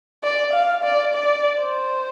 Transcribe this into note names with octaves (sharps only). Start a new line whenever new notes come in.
D5
F5
D5
D5
C5